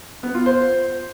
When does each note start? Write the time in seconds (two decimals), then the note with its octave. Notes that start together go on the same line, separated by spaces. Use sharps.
0.23 B3
0.35 F4
0.46 C5